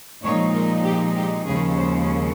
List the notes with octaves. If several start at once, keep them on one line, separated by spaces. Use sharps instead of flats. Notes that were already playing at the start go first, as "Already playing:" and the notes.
A#2 F3 G#3 D#4 C#5
A#4
G4
G4
D#2 C#3 F3 G#3 C#4 G#4
C5